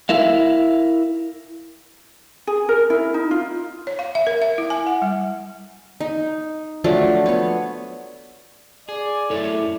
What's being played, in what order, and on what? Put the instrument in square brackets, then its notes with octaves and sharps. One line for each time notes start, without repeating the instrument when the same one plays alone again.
[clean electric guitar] E4 A#4 E5 F5
[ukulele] G#4
A#4
E4
D#4
F4
[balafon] C#5
F5
E5
A#4
E5
E4
G#5
F#5
G3
[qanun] D#4
F3 F#3 A3 D4
B3 C#5
[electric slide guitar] G#4 [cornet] D5
[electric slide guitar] F#2 A3 C#5 [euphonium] E4 [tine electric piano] A4